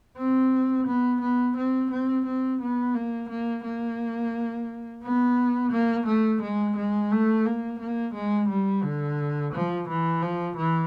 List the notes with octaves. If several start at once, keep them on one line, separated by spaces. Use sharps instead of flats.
C4
B3
B3
C4
C4
C4
B3
A#3
A#3
A#3
B3
A#3
A3
G#3
G#3
A3
A#3
A#3
G#3
G3
D3
F3
E3
F3
E3